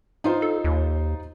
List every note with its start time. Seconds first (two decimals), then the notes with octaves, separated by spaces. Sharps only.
0.24 D#4 F4 C5
0.42 A4
0.64 D#2